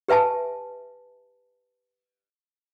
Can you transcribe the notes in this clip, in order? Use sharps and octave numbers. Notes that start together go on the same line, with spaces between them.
G4 B4 E5 G#5 A5